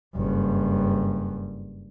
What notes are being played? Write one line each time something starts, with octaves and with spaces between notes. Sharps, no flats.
F#1 G2